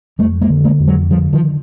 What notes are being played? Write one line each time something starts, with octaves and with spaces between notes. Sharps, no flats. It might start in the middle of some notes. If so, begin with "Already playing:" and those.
F2 G3 A3
G#3 A#3
D3
G#3 A#3
F2
F#3 G#3
D3 F3 G3
D#3 F3